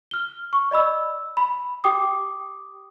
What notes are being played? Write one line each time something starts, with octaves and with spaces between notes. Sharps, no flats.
F6 G7
C#6
D5 D#5 B5 E6
B5
G4 G5 D6 D#6